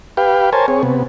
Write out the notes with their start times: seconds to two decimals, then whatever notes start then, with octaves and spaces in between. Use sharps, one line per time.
0.17 G4 B4 F5 G5
0.53 A#4 C5 C#5 G#5 A5
0.68 C4 G#4 C#5
0.83 C3 B3